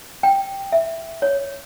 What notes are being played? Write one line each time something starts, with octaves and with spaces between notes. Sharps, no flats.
G5
E5
C#5